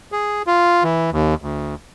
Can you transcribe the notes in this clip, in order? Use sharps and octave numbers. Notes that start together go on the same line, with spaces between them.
G#4
F4
E3
D#2
D2